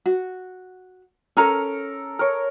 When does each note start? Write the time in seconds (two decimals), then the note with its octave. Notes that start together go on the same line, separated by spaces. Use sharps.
0.06 F#4
1.37 C#4 A4 A#4 A#5
2.19 A#4 C#5